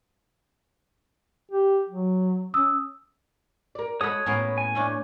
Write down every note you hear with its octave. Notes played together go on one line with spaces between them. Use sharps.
G4
F#3
C#4 D#6 E6
A#4 D5
G#3 A4 C#5 F#5 B5 D#6
A2 A#3 B3 C#4
G#5
A3 C#4 D4